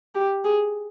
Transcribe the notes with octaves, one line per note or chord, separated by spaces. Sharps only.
G4
G#4